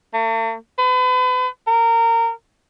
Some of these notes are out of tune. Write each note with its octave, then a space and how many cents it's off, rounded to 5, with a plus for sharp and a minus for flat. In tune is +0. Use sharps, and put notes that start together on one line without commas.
A3 +45
B4 +35
A#4 -20